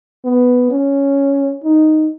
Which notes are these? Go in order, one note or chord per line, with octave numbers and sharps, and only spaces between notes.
B3
C#4
D#4